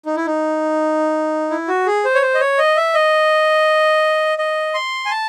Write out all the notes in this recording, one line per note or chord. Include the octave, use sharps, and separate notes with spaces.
D#4
E4
D#4
E4
F#4
G#4
C5
C#5
C5
D#5
C#5
D#5
E5
D#5
D#5
C6
G#5
A5